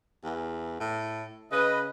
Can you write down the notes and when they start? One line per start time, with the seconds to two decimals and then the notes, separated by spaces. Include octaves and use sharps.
0.24 E2
0.80 A2
1.52 C#3 B4 D#5